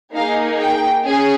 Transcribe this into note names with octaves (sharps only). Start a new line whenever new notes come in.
A#3 D#4 G#4 F5
G5
C#4 G#4